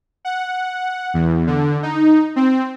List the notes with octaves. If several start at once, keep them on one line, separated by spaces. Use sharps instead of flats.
F#5
E2
D3
D#4
C4